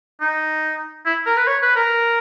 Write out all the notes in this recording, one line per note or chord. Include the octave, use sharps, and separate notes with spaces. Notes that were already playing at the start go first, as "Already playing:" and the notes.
D#4
E4
A#4
B4
C#5
B4
A#4